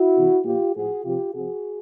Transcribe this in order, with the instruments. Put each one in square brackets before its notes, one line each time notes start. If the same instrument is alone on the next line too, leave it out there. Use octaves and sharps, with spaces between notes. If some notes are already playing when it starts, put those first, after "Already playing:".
Already playing: [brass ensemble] E4 F#4
C3 E3
A#2 F3 F4 G4
A2 F3 F#4 G#4
C3 F3 F4 G4
C3 F3 F#4 G#4